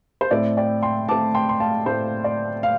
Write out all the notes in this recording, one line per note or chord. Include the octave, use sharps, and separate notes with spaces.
C5
A2 A3 C4 D5
D5 G5
G5 C6
A2 A3 C4 A5 D6
G5 C6
C6
F5 A5
A2 A3 C4 C5
D5
F5